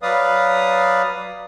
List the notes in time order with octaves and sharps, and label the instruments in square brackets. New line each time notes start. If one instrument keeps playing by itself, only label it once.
[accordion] F#3 B4 D5 F5 D#6